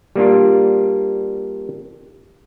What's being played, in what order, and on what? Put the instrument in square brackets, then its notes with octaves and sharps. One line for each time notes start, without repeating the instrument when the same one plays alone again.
[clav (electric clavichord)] G3 A#3 D4 F4